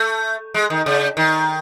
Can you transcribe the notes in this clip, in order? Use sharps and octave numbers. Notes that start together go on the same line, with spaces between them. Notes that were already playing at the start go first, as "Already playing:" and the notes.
Already playing: A3
G#3
D#3
C#3
D#3